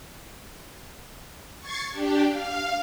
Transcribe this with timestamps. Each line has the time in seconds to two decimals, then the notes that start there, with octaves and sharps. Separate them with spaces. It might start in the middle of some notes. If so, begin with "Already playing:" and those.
1.59 C#6 G#6 A6 C7
1.91 D4 G4
2.29 F5